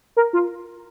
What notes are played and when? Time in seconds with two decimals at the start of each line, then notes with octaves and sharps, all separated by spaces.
0.17 A#4
0.33 F4